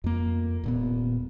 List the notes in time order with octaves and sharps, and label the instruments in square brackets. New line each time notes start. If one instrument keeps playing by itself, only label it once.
[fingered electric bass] F2 A#3
D#1 A#2 B3